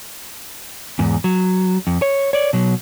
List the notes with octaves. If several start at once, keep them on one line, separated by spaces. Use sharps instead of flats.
E2 G#2
F#3
F2
C#5
C#5 D5
B2 F#3